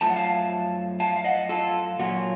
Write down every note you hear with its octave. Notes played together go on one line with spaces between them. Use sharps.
F#2 F3 A3 A5
F#5
F5 A5
F5 A5
F5
D#5 F#5
F4 A4
A#2 F#3 A#3 C#4 F4 F#4